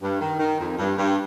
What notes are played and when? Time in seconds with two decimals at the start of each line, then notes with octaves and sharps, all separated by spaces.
0.02 G2
0.20 D#3
0.39 D#3
0.59 F2
0.78 G2
0.97 G2